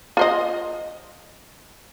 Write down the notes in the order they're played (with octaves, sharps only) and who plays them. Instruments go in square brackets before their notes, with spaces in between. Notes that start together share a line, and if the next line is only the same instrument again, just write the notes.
[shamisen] F4 C5 D#5